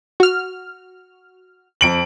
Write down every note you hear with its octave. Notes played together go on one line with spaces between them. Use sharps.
F#4 F6
F2 D7 F#7